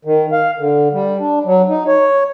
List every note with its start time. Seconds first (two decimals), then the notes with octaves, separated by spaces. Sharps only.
0.05 D#3
0.32 F5
0.59 D3
0.93 G3
1.20 D4
1.45 F#3
1.69 D#4
1.88 C#5